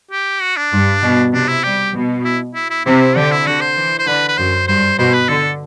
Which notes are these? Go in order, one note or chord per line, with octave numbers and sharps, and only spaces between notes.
G4
F#4
D4
G2
B2
C3 D4
E4
G3 G4
B2
E4
E4
E4
C3 E4
D3 G4
E4
D3 F#4
C5
E3
C5
D3 B4
B4
F#2 C5
G2 C5
B2 C5
B4
D3 A4